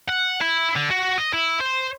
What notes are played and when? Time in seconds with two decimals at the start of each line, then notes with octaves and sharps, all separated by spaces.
0.09 F#5
0.41 E4
0.76 D3
0.91 F#4
1.18 D#5
1.33 E4
1.61 C5